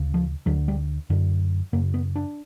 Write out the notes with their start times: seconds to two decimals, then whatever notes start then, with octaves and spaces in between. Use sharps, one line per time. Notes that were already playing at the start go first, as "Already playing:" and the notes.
Already playing: D2 C#3
0.14 F3
0.46 D2 D3 F#3
0.68 G3
1.10 F#2 D3
1.73 F#2 C#3 A#3
1.94 B3
2.16 D4